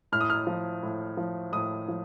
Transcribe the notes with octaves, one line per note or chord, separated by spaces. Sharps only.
A2 F6
D#6
F6
F3
A2
F3
A2 D#6
F3